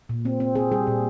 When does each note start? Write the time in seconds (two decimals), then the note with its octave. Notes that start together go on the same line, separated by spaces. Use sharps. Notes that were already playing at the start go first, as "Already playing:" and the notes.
0.09 A#2
0.25 C4
0.40 C4
0.55 C4 G#4
0.72 G3 G#4
0.87 A#2